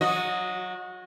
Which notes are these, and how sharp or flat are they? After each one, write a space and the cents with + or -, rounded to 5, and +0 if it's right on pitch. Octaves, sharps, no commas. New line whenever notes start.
F#3 +0 F#4 -30 D#5 +0